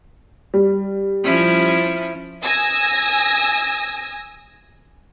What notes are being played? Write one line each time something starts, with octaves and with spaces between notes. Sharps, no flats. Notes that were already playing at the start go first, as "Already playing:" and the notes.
G3
F3 C#4 E4
G#5 D#6 E6 G#6 A#6